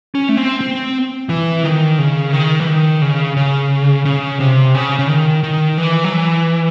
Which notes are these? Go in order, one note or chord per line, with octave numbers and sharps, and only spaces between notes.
C#4
A3
C4
C4
E3
D#3
C#3
D#3
E3
D#3
C#3
C#3
C#3
C3
C#3
C#3
D#3
D#3
E3
F#3
E3